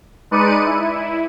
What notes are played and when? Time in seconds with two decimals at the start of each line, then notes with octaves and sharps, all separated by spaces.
0.31 G#3 D#4 B4 D5 C#7 D#7
0.65 E4